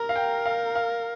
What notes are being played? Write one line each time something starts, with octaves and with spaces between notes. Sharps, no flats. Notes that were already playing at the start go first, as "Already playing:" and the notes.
Already playing: A#4 A#5
F5
G5
F5
F5